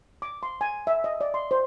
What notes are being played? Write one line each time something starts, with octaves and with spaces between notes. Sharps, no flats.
D6
C6
G#5
E5
D#5
D5
C6
C5